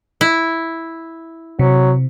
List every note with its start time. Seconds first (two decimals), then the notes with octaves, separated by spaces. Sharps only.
0.21 E4
1.59 C3 F#3